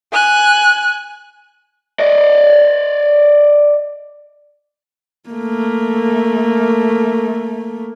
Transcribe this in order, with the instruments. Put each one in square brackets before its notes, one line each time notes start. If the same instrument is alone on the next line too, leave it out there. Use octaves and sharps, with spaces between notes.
[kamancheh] G#5 F#6
[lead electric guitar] D5 D#5
[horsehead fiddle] A3 A#3